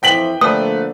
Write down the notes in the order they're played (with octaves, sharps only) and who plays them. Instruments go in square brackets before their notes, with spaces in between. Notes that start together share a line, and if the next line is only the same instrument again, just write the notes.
[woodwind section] F2 E3 F3 [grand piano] G5 B6 F#7
[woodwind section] D3 F3 A#3 [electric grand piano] A3 B4 [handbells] D#6